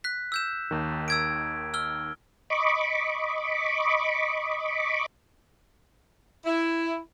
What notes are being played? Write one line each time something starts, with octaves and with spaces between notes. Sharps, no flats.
F#6 B6
E6 G6 E7
D#2 D#3
E6 G#6 D7
E6 F6 G7
D#5 B5 C#6 D6
E4